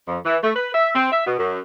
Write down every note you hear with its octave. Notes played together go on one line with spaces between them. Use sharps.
F2
E3
A3
B4
E5
C4
E5
B2
F#2